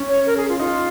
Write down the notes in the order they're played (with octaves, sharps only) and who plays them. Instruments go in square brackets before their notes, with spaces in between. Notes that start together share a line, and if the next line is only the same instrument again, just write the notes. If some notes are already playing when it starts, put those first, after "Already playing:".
Already playing: [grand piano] C#4
[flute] C#5
A#4
G#4
F4
[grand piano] D#4 [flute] F4